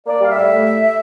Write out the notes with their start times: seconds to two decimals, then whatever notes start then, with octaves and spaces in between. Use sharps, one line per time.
0.06 A#3 D5
0.21 G3 F5
0.28 E5
0.35 A2
0.51 A3